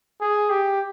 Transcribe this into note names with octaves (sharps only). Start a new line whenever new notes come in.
G#4
G4